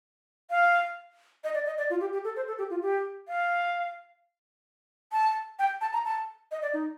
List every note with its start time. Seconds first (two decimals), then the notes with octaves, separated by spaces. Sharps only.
0.51 F5
1.44 D#5
1.54 D5
1.66 D#5
1.78 D5
1.90 F4
2.01 G4
2.13 G4
2.24 A4
2.36 C5
2.48 A4
2.58 G4
2.70 F4
2.82 G4
3.28 F5
5.12 A5
5.59 G5
5.81 A5
5.93 A#5
6.05 A5
6.51 D#5
6.62 D5
6.73 D#4